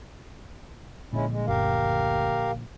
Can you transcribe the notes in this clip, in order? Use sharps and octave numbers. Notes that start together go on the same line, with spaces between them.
A#1 A#2 D3 G#3 C#4 E4
G3 G#3
F#1 D2 G4 A#4 F5